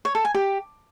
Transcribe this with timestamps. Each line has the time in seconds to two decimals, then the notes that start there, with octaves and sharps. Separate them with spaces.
0.05 C#5
0.15 A4
0.25 G#5
0.35 G4